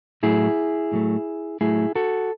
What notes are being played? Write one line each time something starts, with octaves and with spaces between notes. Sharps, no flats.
A2 F#3 A3 E4 G#4
A2 F#3 A3
A2 F#3 A3 E4 G#4
F#4 A4